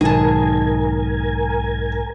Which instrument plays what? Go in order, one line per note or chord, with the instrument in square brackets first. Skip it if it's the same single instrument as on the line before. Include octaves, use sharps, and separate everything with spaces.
[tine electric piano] B1 G#2 [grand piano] D#3 [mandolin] G#4 A5 [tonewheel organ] A#4 G#5